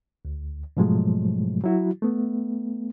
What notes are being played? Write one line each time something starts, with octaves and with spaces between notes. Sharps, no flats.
D2
G#2 B2 F3 F#3 G#3 A3
F#3 E4 F#4
A3 B3